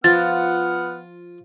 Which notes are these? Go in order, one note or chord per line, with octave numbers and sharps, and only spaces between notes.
F3 B3 F4 F#5 F6 A6